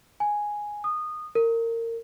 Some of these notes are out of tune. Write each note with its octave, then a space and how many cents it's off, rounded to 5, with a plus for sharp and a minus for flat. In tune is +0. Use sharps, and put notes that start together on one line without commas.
G#5 +0
D#6 -20
A#4 -25